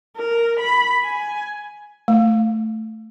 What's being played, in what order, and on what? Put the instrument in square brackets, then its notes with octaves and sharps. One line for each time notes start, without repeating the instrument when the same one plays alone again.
[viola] A#4
B5
G#5
[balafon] A3